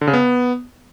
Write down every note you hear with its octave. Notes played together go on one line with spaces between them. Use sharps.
D3
C#3
B3